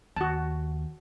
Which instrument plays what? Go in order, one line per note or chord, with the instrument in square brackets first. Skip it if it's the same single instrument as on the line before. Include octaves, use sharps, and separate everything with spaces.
[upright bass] D#2 [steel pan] F#4 A5